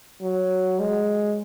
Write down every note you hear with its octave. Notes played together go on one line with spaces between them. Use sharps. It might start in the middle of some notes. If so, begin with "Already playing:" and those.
F#3
G#3